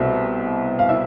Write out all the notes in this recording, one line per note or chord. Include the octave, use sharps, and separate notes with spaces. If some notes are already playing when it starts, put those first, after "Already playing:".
Already playing: C2 B2 A3 C4
F5
E4 E5